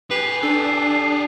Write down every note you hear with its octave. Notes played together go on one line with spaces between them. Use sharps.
G4 G#4 B4 C7
D4 A4